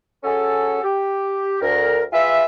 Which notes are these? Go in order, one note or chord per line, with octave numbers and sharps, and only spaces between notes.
C#4 F#4 G#4 A4
G4
D2 A#4
F4 G#4 B4 E5